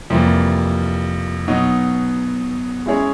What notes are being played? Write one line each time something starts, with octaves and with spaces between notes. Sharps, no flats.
F2 C3 E3 G3 A#3
B2 F#3 B3 D#4
G#3 C#4 E4 G#4 C#5